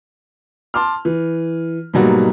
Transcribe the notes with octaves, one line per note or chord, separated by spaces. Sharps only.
A5 C6 D6 F6
E3
G#2 B2 F#3 G3 A#3 F#4